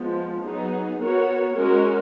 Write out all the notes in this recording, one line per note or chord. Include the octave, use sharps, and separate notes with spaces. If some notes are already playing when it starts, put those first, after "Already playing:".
Already playing: F3 G#3 B3
F#3 B3 D#4 G#4
B3 F#4 A#4 C#5
G#3 C#4 F#4 A#4